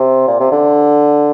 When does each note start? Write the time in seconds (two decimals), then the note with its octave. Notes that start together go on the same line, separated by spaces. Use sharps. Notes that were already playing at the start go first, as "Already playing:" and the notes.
Already playing: C3
0.28 A#2
0.40 C3
0.52 D3